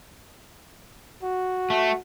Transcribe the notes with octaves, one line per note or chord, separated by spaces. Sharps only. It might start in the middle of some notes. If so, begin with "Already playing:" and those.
F#4
A3